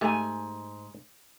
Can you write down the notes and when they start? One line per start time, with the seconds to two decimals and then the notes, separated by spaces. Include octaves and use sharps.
0.01 G#2 A3 G4 G#5